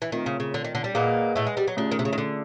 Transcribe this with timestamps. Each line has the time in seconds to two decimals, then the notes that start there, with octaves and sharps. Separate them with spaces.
0.02 E3
0.12 D#3 A3 C4 F4 A#4
0.26 C#3
0.40 C#3
0.54 D3
0.64 D#3
0.75 D3
0.84 G3
0.95 A#2 A#3 G#4 B4 D#5 F#5
1.36 A2 A3
1.47 G#3
1.57 G3
1.68 F#3
1.77 D3 A3 C#4 F4 G#4
1.91 D#3
1.99 C3
2.05 C#3
2.13 D#3
2.18 D3